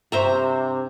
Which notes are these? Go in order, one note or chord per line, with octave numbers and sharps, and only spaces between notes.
G2 C3 C5 E5 A#5 C#6